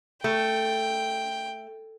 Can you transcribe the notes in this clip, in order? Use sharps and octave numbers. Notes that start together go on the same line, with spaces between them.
A3 G5